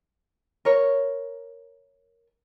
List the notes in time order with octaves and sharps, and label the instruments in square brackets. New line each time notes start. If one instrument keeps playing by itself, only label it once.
[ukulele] A#4 C#5